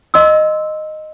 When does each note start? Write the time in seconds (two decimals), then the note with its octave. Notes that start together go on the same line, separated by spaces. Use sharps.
0.14 D#5 C6 E6